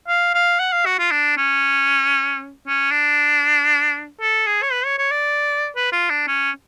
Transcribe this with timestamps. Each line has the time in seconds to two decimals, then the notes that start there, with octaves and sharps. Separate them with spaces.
0.08 F5
0.34 F5
0.60 F#5
0.72 F5
0.85 F#4
0.99 F4
1.11 D4
1.37 C#4
2.67 C#4
2.91 D4
4.21 A4
4.46 G#4
4.63 C#5
4.72 B4
4.85 C#5
4.98 C#5
5.11 D5
5.76 B4
5.92 F4
6.10 D4
6.28 C#4